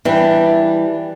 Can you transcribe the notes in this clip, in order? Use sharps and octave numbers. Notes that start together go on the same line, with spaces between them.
E3 G3 D4